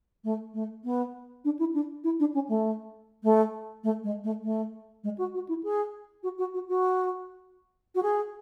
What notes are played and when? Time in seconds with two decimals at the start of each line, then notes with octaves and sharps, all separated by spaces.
0.24 A3
0.54 A3
0.84 B3
1.45 D4
1.59 E4
1.74 D4
2.04 E4
2.20 D4
2.34 C#4
2.49 A3
3.24 A3
3.84 A3
4.04 G#3
4.24 A3
4.44 A3
5.04 G#3
5.18 F#4
5.34 F#4
5.49 E4
5.63 G#4
6.23 F#4
6.38 F#4
6.54 F#4
6.69 F#4
7.95 F#4
8.03 G#4